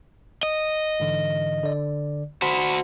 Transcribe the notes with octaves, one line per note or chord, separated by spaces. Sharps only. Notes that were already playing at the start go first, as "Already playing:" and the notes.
D#5
G#2 D3 E3
D3 D5
F#4 C5 B5 B6